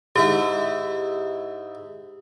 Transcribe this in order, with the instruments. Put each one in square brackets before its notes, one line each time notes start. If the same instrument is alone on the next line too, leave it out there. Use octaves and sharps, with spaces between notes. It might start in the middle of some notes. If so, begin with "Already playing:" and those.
[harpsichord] G#2 E4 [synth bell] G4